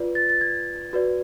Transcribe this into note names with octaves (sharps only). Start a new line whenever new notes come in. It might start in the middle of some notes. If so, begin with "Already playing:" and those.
Already playing: F4 B4 D5
A6
A6
G#6
F#4 B4 D5